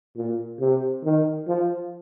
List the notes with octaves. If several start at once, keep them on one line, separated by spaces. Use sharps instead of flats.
A#2
C3
D#3
F3